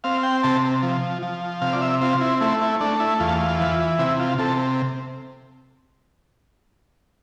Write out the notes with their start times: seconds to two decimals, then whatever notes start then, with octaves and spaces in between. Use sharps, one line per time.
0.04 C4 F5
0.23 G5
0.43 C3 A5
0.82 F3
1.22 F3
1.62 C3 F5
1.73 D5
1.82 E5
2.01 C4 F4
2.21 E4
2.41 A3 E4
2.62 E4
2.81 A3 D4
3.00 E4
3.20 E2 F4
3.60 E3
3.99 C3 E4
4.20 F4
4.38 C3 A4